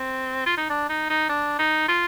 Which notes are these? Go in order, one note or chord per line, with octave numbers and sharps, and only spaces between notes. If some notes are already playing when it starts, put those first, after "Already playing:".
Already playing: C4
F4
D#4
D4
D#4
D#4
D4
D#4
F4